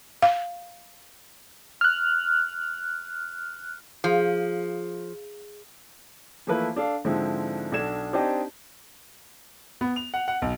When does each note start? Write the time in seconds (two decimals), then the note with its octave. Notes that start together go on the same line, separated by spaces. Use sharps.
0.22 F5
1.81 F6 F#6
4.04 F3 G#4 F5
6.47 E3 F3 A3 A#3 E4 B4
6.76 D4 A4 F5
7.05 G#2 D3 F3 G#3 C4 E4
7.72 B1 D4 A4 G#6 E7
8.13 C4 D4 D#4 G4 D#5 A5
9.81 B3
9.96 F7
10.14 F#5
10.28 F#5
10.42 B1